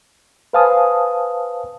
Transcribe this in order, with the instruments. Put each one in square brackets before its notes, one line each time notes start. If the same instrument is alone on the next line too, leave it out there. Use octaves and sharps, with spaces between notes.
[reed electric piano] B4 C5 F5 G#5 A5 D#6